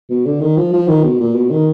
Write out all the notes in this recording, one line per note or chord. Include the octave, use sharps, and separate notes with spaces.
B2
D3
D#3
F3
F3
D#3
B2
A#2
B2
D#3